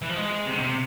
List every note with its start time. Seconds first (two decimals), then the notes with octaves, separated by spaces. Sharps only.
0.02 E3
0.09 F3
0.16 G#3
0.45 C3
0.53 D3
0.60 C3